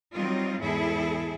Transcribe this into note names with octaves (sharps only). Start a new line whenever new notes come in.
F#3 G3 C4 D#4 F4
E2 G#2 E4 G#4 A4